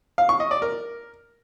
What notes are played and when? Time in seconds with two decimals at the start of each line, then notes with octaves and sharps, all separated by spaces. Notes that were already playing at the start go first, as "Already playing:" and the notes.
0.18 F5
0.29 C#6
0.40 D#5
0.51 D5
0.62 A#4